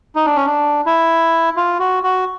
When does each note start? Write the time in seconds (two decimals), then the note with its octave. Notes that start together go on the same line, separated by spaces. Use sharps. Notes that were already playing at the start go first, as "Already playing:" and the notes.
0.15 D#4
0.26 D4
0.36 C#4
0.46 D4
0.86 E4
1.57 F4
1.79 F#4
2.03 F#4